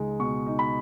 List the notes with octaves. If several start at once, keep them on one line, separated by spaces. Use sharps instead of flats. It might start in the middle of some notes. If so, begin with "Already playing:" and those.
Already playing: C#2 G#3 D#4
B2 C#6
D#4
B5